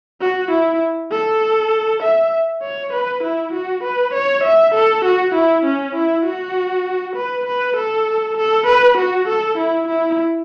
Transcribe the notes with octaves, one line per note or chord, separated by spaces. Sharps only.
F#4
E4
A4
E5
C#5
B4
E4
F#4
B4
C#5
E5
A4
F#4
E4
C#4
E4
F#4
B4
B4
A4
A4
B4
F#4
A4
E4
E4